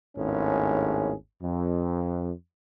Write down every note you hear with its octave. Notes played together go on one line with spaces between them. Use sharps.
G#1 D#2 A2 C#4 G#4
F2